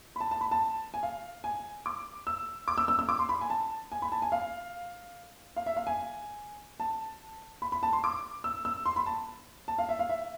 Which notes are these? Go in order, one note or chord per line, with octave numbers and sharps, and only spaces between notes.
B5
A5
A5
B5
A5
G#5
F5
G#5
D6
E6
D6
E6
E6
E6
D6
C6
B5
G#5
A5
G#5
B5
A5
G#5
F5
F5
E5
F5
G#5
A5
B5
B5
A5
C6
D6
E6
E6
C6
B5
A5
A5
F5
E5
F5
E5